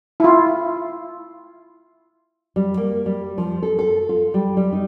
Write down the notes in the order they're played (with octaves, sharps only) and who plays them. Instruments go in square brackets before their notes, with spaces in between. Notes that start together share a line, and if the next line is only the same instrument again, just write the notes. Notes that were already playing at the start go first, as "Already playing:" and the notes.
[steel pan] E4 F4
[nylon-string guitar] G3
A#3
G3
F3
A4
A4
F4
G3
G3
D#4